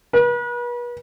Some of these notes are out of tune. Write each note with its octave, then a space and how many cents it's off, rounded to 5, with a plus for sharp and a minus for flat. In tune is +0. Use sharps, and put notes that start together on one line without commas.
B4 -40